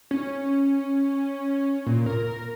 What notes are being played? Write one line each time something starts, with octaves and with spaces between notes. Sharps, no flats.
C#4
A#2
A#4